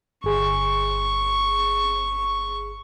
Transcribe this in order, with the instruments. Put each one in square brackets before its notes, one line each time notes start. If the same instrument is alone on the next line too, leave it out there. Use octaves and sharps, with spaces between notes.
[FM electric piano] G1 G#4 C6 [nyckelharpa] C#6